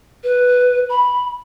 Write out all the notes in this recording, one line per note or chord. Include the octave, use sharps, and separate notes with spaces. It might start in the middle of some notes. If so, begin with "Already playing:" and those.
B4
B5